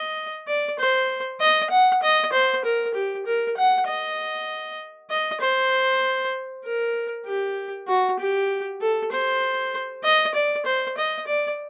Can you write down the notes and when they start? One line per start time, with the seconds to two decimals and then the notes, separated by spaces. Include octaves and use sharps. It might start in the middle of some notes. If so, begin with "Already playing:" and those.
Already playing: D#5
0.47 D5
0.79 C5
1.40 D#5
1.71 F#5
2.02 D#5
2.32 C5
2.64 A#4
2.94 G4
3.26 A#4
3.57 F#5
3.88 D#5
5.10 D#5
5.41 C5
6.65 A#4
7.26 G4
7.88 F#4
8.19 G4
8.81 A4
9.12 C5
10.04 D#5
10.34 D5
10.66 C5
10.97 D#5
11.27 D5